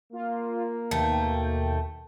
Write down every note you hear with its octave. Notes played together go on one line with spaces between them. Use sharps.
A#3 F4
D#2 B2 A3 G5